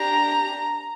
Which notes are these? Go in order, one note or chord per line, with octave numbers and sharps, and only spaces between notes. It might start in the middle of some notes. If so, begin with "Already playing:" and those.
Already playing: D4 G4 A#5